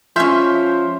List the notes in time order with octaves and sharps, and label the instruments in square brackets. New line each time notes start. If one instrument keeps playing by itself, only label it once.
[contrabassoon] F3 [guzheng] G#3 C#4 [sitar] E5 [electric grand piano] C6 F6 G6